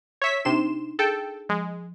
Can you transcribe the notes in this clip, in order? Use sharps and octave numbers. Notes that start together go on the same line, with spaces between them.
C#5 E5 B6
C3 D4 D#4 C6 E7
G#4 A4 G5 A5
F3 G#3